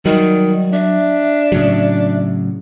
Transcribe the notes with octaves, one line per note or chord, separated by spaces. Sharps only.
D#3 F#3 G3
D4 E5
A2 C#3 F#3